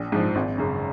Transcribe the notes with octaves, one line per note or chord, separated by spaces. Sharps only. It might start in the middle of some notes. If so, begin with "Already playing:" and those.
Already playing: A#1
G#2 F3
G#1
F#2 C#3